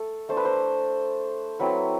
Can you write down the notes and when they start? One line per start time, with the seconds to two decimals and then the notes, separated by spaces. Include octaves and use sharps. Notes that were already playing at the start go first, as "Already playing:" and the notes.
Already playing: A3 A4
0.29 A3 D4 C5
0.37 B4
0.45 C5
1.60 F#3 C4 E4 B4